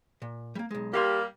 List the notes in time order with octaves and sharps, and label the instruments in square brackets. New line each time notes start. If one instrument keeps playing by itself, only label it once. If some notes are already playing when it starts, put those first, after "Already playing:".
[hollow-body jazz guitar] A#2
G3 A#3
B1 G#3
[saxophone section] G3 A#3 [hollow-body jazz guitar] G4 F5 C6